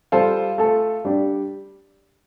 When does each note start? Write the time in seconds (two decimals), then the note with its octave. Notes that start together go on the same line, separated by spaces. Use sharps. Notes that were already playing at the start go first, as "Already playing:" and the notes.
0.12 G3 F4 A4 C5
0.58 A3 F4 A4
1.05 G3 D4 G4